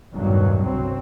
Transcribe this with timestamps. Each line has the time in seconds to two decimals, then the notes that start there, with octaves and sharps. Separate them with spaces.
0.12 A1 E2 G2 B2 D#3 F#3
0.63 G1 C2 F#3 C4